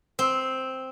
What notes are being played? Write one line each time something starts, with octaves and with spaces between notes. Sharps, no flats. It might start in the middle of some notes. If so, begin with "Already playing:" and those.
C4